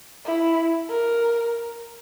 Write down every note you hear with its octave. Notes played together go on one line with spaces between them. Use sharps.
E4
A#4